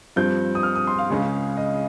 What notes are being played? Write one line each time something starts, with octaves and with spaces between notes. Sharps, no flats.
G2 F3 C4 G6
D#6
F6
D#6
C6
F5
C#2 C#3 G#3 C#4
D#5